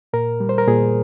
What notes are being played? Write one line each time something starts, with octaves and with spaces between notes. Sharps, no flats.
A#2 A#4
G3
C5
A#4
A#2 G#4